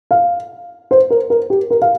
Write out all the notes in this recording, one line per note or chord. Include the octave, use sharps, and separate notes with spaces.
F5
C5
A#4
A#4
G4
A#4
F5